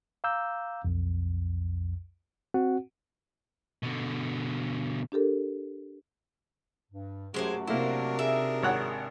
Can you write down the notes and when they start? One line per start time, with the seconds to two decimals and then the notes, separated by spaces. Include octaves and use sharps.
0.24 F5 A#5 D6 E6 G6
0.85 B1 F2
2.54 C4 F#4 F#5
3.83 B2 D3
5.12 D4 G4 A4 A#4
6.92 G2
7.34 F#2 F#3 G#3 A3 F#4 G4 C5 G#5
7.68 C3 A#3 D4 E4 A#4 C5
8.19 D#4 F#4 G#4 E5
8.63 G#1 C#5 F#5